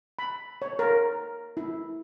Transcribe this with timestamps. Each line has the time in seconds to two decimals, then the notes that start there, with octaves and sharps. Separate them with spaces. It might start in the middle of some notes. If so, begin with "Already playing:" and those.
0.19 B5
0.62 C#5
0.79 A#4
1.57 E4